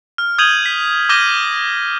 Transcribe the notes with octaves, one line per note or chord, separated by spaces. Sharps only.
F6
D#6 G6 G#6 D#7 F7 F#7
B6
D6 F6 G6 A#6 D#7 G7